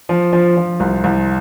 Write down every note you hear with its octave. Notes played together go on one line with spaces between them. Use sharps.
F3
F3
F3
C2
C2